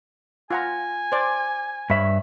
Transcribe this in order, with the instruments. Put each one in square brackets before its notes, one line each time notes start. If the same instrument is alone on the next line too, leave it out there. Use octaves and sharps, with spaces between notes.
[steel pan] F4 F#5 A#5 [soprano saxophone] G#5
[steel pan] C5 D5
[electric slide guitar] G2 E5 [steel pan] C#5 B5